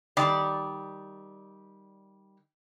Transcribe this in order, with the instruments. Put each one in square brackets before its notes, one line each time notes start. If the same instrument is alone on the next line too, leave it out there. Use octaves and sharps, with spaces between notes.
[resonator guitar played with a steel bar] D#3 G3 D5